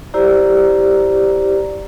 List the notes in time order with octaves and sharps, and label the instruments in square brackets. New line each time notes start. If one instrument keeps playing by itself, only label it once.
[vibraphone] E4 G4 C5 D5 A#5